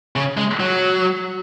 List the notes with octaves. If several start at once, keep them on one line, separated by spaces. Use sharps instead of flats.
C#3
G#3
F#3